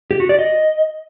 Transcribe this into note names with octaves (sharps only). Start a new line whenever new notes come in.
G4
F#4
D5
D#5